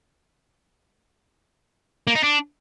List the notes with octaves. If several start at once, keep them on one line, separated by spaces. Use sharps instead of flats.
A#3
D#4
D4